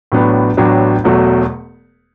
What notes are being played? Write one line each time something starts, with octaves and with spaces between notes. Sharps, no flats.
A1 A2 F#3 B3 D4
A1 A2 F#3 B3 D4
E1 E2 B2 F#3 A3